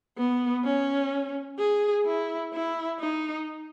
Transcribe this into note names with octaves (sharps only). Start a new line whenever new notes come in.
B3
C#4
G#4
E4
E4
D#4